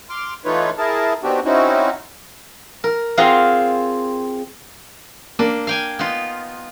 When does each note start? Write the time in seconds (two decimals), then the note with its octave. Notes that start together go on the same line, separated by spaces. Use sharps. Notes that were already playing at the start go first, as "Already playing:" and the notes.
0.10 C6 D6 F6
0.45 E3 A3 D#4 F4 B4 C#5
0.78 E4 G#4 A#4 A5
1.23 D#3 B3 C4 D4 F#4 G4
1.45 C4 C#4 D#4 E4 F#4
2.84 A#4
3.17 C4 F4 G#4 F5 F#5 A#5
5.39 A#3 D4
5.67 F5 G5 G#5
5.99 B3 D#4 F4